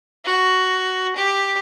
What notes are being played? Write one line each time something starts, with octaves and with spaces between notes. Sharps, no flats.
F#4
G4